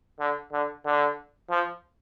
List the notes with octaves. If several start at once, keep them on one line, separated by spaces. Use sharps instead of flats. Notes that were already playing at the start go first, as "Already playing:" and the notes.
D3
D3
D3
F3